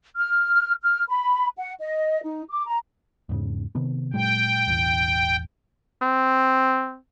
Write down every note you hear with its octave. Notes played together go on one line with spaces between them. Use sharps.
F6
F6
B5
F#5
D#5
D#4
D6
A#5
E2 G#2 C#3
C3 D#3 B3
A#2 F#3 G#3 G5
E1 A1 E2
C4